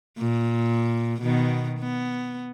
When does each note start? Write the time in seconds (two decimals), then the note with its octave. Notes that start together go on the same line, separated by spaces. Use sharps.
0.19 A#2
1.21 B2 D#3 B3
1.79 B3